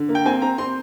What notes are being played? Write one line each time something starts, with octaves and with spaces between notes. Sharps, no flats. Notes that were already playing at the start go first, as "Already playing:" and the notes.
Already playing: D3
A#3
G5
C4 G#5
C4 A#5
C4 C6